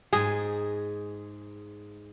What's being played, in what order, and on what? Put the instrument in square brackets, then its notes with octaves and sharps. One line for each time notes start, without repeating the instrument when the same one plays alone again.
[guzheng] G#2 [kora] G#4